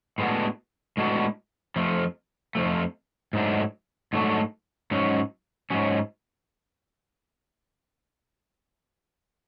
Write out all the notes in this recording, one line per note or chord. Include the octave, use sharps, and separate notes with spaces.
A2 G#3 B3 D4 F#4
A2 G#3 B3 D4 F#4
F2 F3 A3
F2 F3 A3
G#2 F#3 A3 D4
G#2 F#3 A3 D4
G#2 F#3 C#4
G#2 F#3 C#4